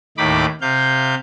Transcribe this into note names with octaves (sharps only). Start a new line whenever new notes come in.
D#2 A2 D#4 B5 D6
C3 F5 G6